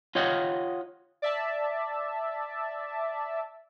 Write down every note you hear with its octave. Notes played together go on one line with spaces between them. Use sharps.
F4 C#5 D#5 F#5 G5
D5 E5 A5